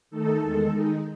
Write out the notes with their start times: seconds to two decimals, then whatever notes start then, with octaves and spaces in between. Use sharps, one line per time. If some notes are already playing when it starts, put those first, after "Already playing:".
0.11 D#3 A3 D#4 A4
0.39 E2 D#3 G#3
0.69 D#3 G#3 D#4